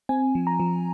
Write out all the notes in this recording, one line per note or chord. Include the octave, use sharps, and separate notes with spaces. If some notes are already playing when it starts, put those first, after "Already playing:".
C4 G#5
F3
A#5
F3